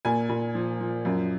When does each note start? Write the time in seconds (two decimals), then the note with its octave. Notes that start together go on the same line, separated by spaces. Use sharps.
0.05 A#2 G#5
0.29 A#2
0.55 F3
0.80 F3
1.05 F#2